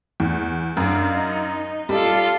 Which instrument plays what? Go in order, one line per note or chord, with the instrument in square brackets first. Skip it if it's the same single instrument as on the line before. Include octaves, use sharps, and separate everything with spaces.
[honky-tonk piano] E2
[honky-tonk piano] F#2 [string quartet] D4 F5
[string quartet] D#4
[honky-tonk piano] G3 [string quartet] F4 A4 D5